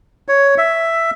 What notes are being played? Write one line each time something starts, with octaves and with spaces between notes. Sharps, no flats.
C#5
E5